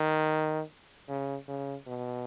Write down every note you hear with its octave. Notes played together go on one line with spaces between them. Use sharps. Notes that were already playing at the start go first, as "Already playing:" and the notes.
Already playing: D#3
C#3
C#3
B2